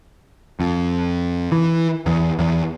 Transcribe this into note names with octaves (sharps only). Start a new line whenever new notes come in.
F2
E3
E2
E2